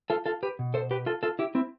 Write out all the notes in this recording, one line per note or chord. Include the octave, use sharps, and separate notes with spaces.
F4 A4
F4 A4
G4 B4
B2
A4 C5
G4 B4
F4 A4
F4 A4
E4 G4
C4 E4